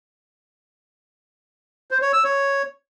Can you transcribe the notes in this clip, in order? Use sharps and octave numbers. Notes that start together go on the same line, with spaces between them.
C5
C#5
E6
C#5